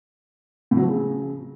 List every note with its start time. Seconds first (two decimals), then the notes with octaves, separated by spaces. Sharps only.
0.71 A2
0.77 F#3
0.82 F3
0.88 C#3